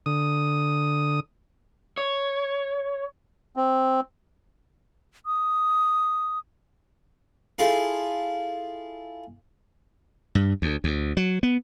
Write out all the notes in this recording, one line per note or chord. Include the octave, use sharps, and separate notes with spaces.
D3 D#6
C#5
C4
D#6
E4 F4 G#4 A4 F5
G2
D2
D2
F#3
B3